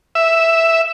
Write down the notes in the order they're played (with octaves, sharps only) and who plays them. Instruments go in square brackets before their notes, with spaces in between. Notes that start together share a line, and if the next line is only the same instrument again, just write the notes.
[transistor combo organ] E5